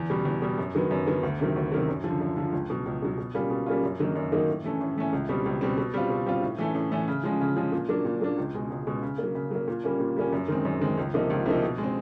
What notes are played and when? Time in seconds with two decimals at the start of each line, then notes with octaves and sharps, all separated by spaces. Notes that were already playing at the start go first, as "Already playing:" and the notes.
Already playing: E2
0.10 B2 G3
0.25 E2
0.42 B2 G3
0.58 F#2
0.75 D#3 F#3 B3
0.91 F#2
1.06 D#3 F#3 B3
1.23 D2
1.40 C3 D#3 F#3
1.56 D2
1.72 C3 D#3 F#3
1.88 F#2
2.04 D3 F3
2.20 F#2
2.37 D3 F3
2.52 C#2
2.70 B2 F#3
2.86 C#2
3.02 B2 F#3
3.18 B2
3.35 G3 A#3 C#4 F4
3.50 B2
3.66 G3 A#3 C#4 F4
3.83 F#2
4.00 D#3 F#3 A#3 D#4
4.15 F#2
4.32 D#3 F#3 A#3 D#4
4.48 A2
4.64 E3 A3 C#4
4.81 A2
4.96 E3 A3 C#4
5.13 C#2
5.29 B2 G3 C4
5.46 C#2
5.61 B2 G3 C4
5.78 B2
5.94 G3 C4 F4
6.10 B2
6.26 G3 C4 F4
6.43 A2
6.58 E3 A3 C#4
6.75 A2
6.92 E3 A3 C#4
7.08 C#3
7.24 F3 G#3 C#4
7.41 C#3
7.57 F3 G#3 C#4
7.72 A#2
7.89 F#3 A#3 D4
8.05 A#2
8.21 F#3 A#3 D4
8.38 C#2
8.54 B2 G#3
8.71 C#2
8.87 B2 G#3
9.02 C#3
9.18 A#3
9.23 F#3
9.35 C#3
9.51 F#3 A#3
9.68 A#2
9.84 G3 A#3 C#4
10.00 A#2
10.16 G3 A#3 C#4
10.33 F#2
10.48 D#3 G#3 C4
10.65 F#2
10.81 D#3 G#3 C4
10.98 C#2
11.14 C3 F3 A#3 D#4
11.30 C#2
11.46 C3 F3 A#3 D#4
11.63 B2
11.78 G#3
11.83 C4